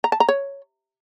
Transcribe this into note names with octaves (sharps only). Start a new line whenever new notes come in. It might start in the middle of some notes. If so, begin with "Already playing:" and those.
A#5
A5
A#5
C#5